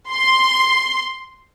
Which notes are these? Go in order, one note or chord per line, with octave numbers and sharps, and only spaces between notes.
C6